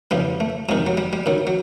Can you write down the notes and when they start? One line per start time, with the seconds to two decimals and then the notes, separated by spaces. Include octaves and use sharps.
0.11 F2 C#3 E3 G3
0.40 A3
0.69 F2 C3 D#3 G#3
0.87 F#3
0.97 G3
1.13 G3
1.26 F#2 D#3 F#3
1.47 F#3